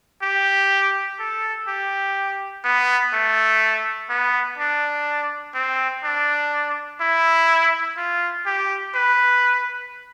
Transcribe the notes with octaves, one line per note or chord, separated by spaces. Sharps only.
G4
A4
G4
B3
A3
B3
D4
C4
D4
E4
F4
G4
B4